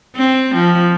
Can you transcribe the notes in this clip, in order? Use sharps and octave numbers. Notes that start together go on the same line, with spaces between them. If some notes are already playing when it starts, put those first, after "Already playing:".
C4
F3